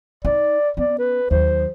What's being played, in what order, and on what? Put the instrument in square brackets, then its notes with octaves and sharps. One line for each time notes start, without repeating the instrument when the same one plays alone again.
[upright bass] D#4 [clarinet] D5
[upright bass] B3 C#4 [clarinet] D5
[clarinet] B4
[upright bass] D#2 F#3 [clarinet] C5